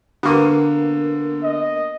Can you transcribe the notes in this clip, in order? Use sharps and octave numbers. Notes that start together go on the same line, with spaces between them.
D3 A#3 B3 C#6 D#7
D#5